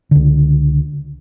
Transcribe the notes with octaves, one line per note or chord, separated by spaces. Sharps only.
C#2 D3